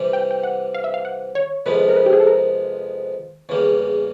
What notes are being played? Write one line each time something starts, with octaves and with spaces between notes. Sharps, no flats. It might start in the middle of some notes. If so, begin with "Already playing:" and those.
Already playing: C3 E3 G3
G5
G5
F#5
F5
E5
F5
F#5
C#5
F2 C3 F3 G#3 B3 B4
A#4
B4
G4
G#4
A4
A#4
E2 C#3 E3 G3 A#3